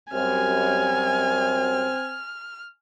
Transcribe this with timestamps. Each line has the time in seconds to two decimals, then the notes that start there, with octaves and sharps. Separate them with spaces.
0.13 F#2 G3 C4 G#5 F6